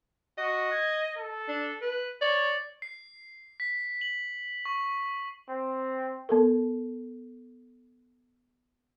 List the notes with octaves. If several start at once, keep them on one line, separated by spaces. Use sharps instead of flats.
F#4 D#5
G#6
A4
D4
B4
C#5 D5
C7
B6
F#7
C#6
C4
B3 A4 A#4